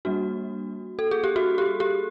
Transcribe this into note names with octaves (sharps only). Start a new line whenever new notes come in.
G3 A#3 D4 F#4
A4
G#4
G4
F#4
G4
G4